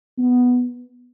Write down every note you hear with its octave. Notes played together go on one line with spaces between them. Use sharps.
B3